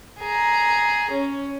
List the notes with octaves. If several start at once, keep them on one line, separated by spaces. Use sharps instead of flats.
G#4 A#5
C#4